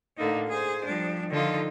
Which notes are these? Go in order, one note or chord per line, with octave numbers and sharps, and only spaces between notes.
A2 D3 A#3 D#4
G#4 C5
F3 G3 D4
D3 D#3 F3 D#4 F4 A4